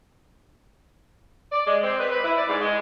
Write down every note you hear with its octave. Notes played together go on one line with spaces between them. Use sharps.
D5
G#3
C4
B4
B4
E4
D5
G#2
G#3